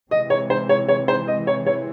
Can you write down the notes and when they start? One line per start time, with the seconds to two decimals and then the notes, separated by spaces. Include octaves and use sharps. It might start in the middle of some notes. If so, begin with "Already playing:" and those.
0.11 C3 E3 G#3 C4 D#5
0.30 C#5
0.50 C5
0.69 C#5
0.89 C#5
1.08 C5
1.28 D#5
1.47 C#5
1.67 C#5